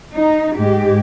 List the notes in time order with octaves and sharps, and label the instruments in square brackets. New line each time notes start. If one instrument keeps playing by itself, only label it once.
[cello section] D#4
G#2 G#3 G4